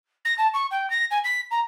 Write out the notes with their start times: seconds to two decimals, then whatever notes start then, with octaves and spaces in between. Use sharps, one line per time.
0.25 A#6
0.38 A5
0.54 C#6
0.71 G5
0.90 A#6
1.11 G#5
1.24 B6
1.51 A#5